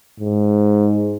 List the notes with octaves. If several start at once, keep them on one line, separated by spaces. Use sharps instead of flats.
G#2